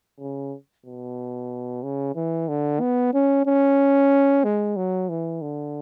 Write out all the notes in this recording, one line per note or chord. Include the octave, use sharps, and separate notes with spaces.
C#3
B2
C#3
E3
D3
B3
C#4
C#4
G#3
F#3
E3
D3